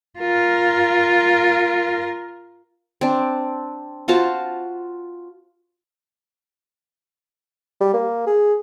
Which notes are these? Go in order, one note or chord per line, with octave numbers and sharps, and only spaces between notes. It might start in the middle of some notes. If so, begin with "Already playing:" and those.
F4 A#4
C4 D4
F4 F#4 C5 A5
G3
A#3
G#4